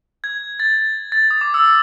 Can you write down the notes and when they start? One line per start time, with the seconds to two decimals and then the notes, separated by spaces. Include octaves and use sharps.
0.24 G#6
0.60 A6
1.12 A6
1.31 D#6
1.41 D6
1.54 E6